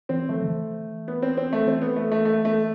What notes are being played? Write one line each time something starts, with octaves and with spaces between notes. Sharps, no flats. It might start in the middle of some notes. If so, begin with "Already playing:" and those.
E3 C4
F3 A3
D3
E3
B3
C4
C4
A3
E3 C4
B3
A3
A3
A3
A3